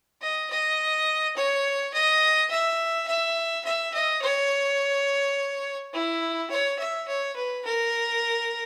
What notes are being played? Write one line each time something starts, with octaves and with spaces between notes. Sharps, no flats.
D#5
D#5
C#5
D#5
E5
E5
E5
D#5
C#5
E4
C#5
E5
C#5
B4
A#4